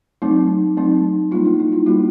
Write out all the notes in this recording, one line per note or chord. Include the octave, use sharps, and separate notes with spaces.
F#3 A3 C4 D#4
F#3 A3 C4 D#4
G3 A#3 D4 D#4 F4
D#4
E4
D#4 F4
G3 A#3 D4 E4 F#4